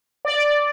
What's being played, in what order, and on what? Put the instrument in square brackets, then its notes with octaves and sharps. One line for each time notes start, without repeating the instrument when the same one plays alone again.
[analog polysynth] D5